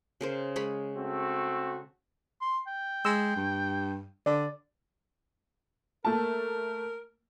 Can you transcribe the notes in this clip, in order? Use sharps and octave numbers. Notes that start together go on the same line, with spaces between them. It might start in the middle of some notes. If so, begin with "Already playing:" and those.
C#3 A#4 C5
G#3 C#5 B5
A3 C4 F#4
C6
G5
G#3 E6
G2
D3 D5
A3 A#3 A#4 A5